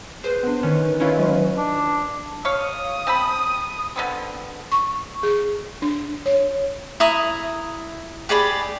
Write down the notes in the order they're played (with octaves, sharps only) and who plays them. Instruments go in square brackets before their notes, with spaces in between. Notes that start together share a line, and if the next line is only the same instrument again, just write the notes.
[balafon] G#4 [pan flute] B4 [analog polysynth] C5
[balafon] B3 D4
[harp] D#3 [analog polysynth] C#4
[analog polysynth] C#4 E4 F4
[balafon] F#3 G#3
[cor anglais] D4
[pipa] C#5 F5 [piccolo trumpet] D#6
[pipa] C4 A5 B5
D3 B3 C4
[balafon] C#6
G#4
D4
C#5
[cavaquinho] E4 A#5 D#6
G4 G#4 D5 B5